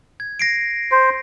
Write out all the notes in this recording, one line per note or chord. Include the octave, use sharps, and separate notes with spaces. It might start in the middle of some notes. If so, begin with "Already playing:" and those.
G#6
A#6 C7 D7
C5